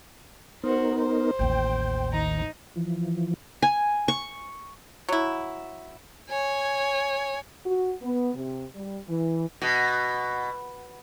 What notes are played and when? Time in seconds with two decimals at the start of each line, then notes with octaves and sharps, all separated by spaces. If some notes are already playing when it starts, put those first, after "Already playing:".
0.64 B3 D#4 F#4 A#4 C5
0.98 C5
1.39 A1 D#2 G5
2.13 D#3 D#4 A#5
2.76 E3 F3
3.62 G#5
4.08 C#6
5.09 F#3 E4
6.29 C#5 G#5
7.66 F#4
8.02 B3
8.34 C3
8.74 G3
9.08 E3
9.62 B2